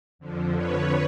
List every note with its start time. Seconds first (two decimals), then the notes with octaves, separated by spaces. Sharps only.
0.19 F2 D3 F3
0.55 B4 C#5